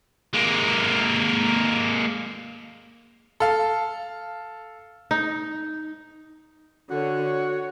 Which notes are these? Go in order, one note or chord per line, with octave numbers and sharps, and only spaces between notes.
G#3 A#3
A4 F5
D#4
D3 F#4 C#5
C#5